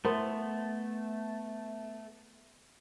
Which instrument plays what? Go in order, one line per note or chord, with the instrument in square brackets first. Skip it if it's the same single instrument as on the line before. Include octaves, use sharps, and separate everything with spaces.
[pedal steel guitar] A3 [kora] B3 [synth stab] E4 A#4 C5